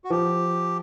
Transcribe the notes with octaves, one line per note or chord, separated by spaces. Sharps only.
F#4
F3 G4